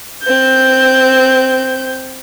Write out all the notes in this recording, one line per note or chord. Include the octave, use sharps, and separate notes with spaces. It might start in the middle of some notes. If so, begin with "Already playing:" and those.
C4 G6